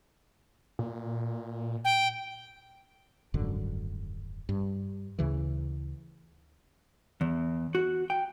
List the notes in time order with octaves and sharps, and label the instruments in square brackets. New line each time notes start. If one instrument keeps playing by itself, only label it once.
[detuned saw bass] A#2
[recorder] G5
[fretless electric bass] D#1 G#1 F#2 D3
G2
D2 C#3 E3
[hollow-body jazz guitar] E2
F#4
G5